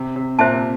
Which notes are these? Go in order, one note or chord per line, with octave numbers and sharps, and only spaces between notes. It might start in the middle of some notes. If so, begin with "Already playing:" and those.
Already playing: C3
C3
A#2 C5 E5 A5
C3